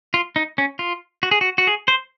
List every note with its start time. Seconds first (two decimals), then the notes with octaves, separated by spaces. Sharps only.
0.14 F4
0.36 D#4
0.58 C#4
0.79 F4
1.23 F#4
1.31 G#4
1.41 F#4
1.58 F#4
1.67 G#4
1.88 C5